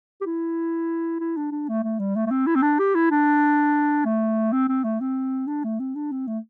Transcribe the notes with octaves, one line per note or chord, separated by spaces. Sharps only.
G4
E4
E4
D4
D4
A3
A3
G3
A3
A3
C4
E4
C4
D4
G4
E4
D4
A3
C4
C4
A3
C4
D4
A3
C4
D4
C4
A3